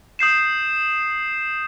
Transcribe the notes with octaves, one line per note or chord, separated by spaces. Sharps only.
D#6 G6 C7 E7